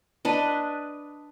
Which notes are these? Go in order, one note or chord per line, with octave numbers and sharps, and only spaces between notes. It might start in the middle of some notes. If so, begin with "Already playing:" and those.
D4 B4 D#5